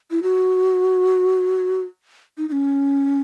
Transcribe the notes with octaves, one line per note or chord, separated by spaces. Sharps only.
E4
F#4
D#4
D#4
C#4